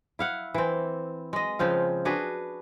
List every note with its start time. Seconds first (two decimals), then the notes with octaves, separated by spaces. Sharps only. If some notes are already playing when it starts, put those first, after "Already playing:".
0.19 E4 F5 F#5
0.54 E3 C4
1.33 G#3 D#5
1.59 C#3 F3 C4 F5
2.05 D4 F#4 G#4 B4